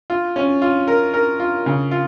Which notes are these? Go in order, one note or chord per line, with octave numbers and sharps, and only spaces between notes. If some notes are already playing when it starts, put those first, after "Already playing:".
F4
C#4
F4
A#4
A#4
F4
C#3
F4